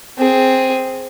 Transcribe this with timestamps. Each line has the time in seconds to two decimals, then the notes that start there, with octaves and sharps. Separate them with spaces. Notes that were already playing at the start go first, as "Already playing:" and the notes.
0.18 C4 G#4